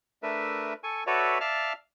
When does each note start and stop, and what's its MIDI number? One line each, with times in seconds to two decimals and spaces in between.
0.23 0.73 57
0.23 0.73 62
0.23 0.73 70
0.23 0.73 71
0.23 0.73 76
0.83 1.04 69
0.83 1.04 80
0.83 1.04 85
1.07 1.38 66
1.07 1.38 69
1.07 1.38 71
1.07 1.38 73
1.07 1.38 74
1.07 1.38 76
1.41 1.73 74
1.41 1.73 76
1.41 1.73 77
1.41 1.73 81
1.41 1.73 89